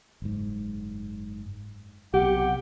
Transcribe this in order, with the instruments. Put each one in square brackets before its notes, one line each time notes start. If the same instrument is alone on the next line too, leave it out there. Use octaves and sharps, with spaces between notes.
[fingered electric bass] F#1 G#2
[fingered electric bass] B1 C3 [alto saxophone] G4 [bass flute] F#5